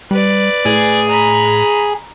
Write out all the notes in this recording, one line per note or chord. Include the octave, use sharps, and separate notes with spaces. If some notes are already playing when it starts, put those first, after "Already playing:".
G3 B4 D5
A2 G#4
A#5 B5